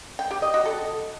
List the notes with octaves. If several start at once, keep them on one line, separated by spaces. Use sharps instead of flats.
G5
G4
D#5
F#4
A4